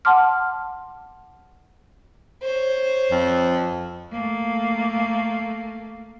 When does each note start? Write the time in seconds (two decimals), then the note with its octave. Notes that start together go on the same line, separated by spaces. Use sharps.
0.05 F#5 A5 C6 D6 F6
2.43 C5 C#5
3.11 F2
4.12 A3 A#3